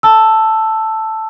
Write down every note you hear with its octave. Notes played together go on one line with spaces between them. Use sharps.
A5 E6